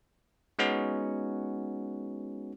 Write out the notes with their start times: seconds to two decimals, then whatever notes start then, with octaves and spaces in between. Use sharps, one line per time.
0.59 G#3 B3 C#4 D#4 F#4